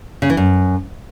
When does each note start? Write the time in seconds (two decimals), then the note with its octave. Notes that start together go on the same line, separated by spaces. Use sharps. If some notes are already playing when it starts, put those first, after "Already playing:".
0.22 C#3
0.30 E3
0.37 F#2